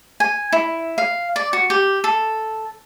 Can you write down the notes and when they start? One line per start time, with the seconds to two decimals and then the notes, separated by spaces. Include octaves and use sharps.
0.20 G#5
0.52 E4
0.98 F5
1.36 D5
1.53 F#4
1.70 G4
2.04 A4